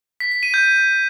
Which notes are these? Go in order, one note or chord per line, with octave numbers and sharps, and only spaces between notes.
B6
B6
D#7
G6